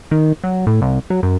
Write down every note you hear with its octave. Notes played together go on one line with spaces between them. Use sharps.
D#3
F#3
A2
C2
F#3
F#2